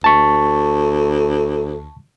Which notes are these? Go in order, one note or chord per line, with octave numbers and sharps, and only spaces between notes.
D2 A5 C#6